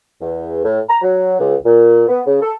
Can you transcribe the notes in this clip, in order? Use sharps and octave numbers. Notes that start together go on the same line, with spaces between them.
E2
A2
A#5
F#3
C#2
A#2
B3
C#3
A4